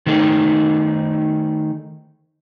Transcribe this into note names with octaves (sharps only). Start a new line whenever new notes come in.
D#3 A3 D#4 G#4